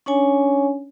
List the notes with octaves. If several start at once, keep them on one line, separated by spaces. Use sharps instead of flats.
C#4 D4 C#5 G#5